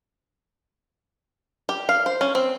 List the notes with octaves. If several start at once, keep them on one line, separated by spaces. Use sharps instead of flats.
G4
F5
C5
C#4
C4